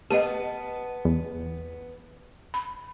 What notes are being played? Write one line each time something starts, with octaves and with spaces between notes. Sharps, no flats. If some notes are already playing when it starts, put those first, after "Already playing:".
B3 G4 D#5 A5 D#7
E2
B5